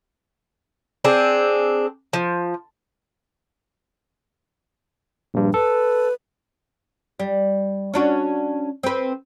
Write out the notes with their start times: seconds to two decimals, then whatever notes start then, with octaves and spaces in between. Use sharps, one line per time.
1.05 C4 D4 G#4
2.13 F3
5.34 A#1 G2
5.54 A4 B4
7.19 G3
7.94 C#4 D4 F#4
8.83 C4 B4